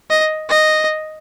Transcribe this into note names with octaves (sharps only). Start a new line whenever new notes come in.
D#5
D#5